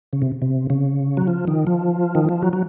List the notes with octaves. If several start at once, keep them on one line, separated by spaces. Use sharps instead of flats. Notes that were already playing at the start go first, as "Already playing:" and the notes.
C#3
C3
C3
C#3
F#3
F3
D#3
F3
D#3
F3
F#3
F#3